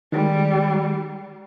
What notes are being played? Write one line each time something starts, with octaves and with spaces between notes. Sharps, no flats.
D#3 G3 G#3